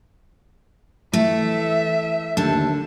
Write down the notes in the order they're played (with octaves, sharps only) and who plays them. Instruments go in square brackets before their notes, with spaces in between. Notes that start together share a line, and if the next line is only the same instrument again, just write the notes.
[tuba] E3 [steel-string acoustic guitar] A3 [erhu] E5
[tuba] D#2 [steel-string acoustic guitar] D3 A3 A5